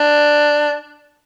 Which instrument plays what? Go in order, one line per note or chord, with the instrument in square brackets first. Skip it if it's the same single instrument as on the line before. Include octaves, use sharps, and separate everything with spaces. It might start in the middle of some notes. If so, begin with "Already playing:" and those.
Already playing: [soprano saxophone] D4